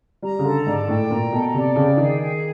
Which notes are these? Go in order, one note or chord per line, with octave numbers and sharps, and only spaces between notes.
G3 A#5
C#3
D3 A4
G#2 D5
A2 G5
A#2 A#5
B2 A4
C3 D5
C#3 G5
D#3 G#4
G#4